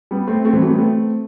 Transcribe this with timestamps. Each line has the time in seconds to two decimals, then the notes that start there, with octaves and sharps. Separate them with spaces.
0.11 G3 B3
0.27 A3 C4
0.45 A3 C4
0.53 E3 G3
0.61 F#3 A3
0.70 G3 B3
0.79 A3 C4